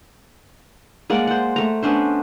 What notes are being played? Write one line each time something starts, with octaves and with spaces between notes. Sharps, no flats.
G#3 A#3 D5 F#5
C5 F#5
A3 A#5
B3 C#4 D4 C5